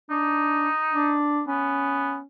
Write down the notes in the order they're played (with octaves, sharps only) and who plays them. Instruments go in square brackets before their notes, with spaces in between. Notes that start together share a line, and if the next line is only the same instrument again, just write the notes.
[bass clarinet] D4 [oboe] D#4
[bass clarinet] D4
[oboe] B3 [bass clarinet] C#4